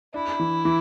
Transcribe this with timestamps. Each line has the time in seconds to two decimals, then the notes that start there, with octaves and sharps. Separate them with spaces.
0.14 D4 E4
0.40 E3
0.65 E3